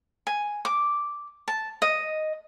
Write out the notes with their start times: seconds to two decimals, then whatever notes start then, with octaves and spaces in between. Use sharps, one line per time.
0.27 G#5
0.65 D6
1.48 A5
1.82 D#5